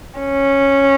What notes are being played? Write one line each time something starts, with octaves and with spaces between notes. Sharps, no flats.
C#4